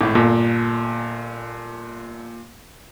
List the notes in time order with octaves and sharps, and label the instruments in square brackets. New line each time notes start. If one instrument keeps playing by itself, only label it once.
[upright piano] G#1 A2
[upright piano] G1 [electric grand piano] A#2